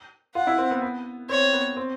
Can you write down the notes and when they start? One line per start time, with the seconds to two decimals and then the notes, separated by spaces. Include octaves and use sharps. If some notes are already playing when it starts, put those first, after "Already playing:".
0.35 F4 F#5
0.47 E4
0.58 C4
0.71 B3
0.82 B3
1.29 C4 C#5
1.53 B3
1.77 C4